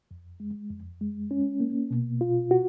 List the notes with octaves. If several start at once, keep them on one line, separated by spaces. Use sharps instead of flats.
F2
G#3
F2
G#3
C#4
A#3
B2
F4
F#4